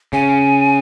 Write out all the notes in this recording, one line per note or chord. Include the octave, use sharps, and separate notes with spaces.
C#3 G#5